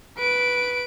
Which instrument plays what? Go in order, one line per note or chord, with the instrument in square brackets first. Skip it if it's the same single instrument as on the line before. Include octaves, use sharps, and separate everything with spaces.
[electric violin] B4 D7